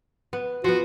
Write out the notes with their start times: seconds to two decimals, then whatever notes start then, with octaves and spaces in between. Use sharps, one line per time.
0.33 B3
0.64 F3 B3 F#4